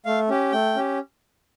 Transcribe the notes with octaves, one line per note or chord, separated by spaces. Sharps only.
A3 F5
C#4 G4
A3 G5
C#4 G4